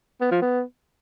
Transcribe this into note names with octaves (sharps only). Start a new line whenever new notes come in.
B3
F3
B3